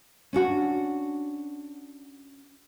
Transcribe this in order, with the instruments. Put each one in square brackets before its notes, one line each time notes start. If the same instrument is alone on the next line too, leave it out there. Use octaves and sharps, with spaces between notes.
[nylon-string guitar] C#4 D4 F#4